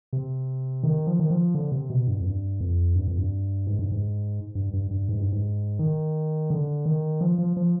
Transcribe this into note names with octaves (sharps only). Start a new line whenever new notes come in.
C3
D#3
F3
D#3
F3
D3
C3
B2
G2
F2
G2
F2
G2
F2
G2
G#2
G2
G#2
G2
G2
G2
G#2
G2
G#2
D#3
D3
D#3
F3
F3
F3